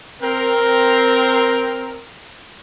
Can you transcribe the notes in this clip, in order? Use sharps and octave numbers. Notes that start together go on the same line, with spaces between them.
C4 A#4